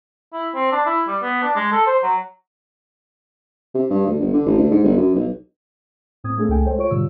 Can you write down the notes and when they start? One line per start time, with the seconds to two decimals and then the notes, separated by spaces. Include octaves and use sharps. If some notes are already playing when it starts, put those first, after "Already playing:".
0.33 E4
0.55 C4
0.72 D4
0.86 E4
1.07 G3
1.22 B3
1.43 D4
1.56 G#3
1.72 A4
1.86 C5
2.03 F#3
3.75 C3
3.90 G2
4.07 D2
4.20 G1
4.33 D3
4.46 A1
4.58 D2
4.71 G#2
4.84 G1
4.97 F#2
5.15 B1
6.24 A2 C4 D#6 G#6
6.37 A3 A#3 C4 D4 G#4 A4
6.49 C#2 A3 A4 G5 G#5
6.65 G#3 A4 C5 C#5 G5
6.78 F4 C#5 C#6 D7
6.90 G#2 B2 D3 G3 F4 E6